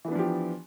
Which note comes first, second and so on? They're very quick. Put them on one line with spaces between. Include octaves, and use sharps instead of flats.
E3 B3 D4 F3 G4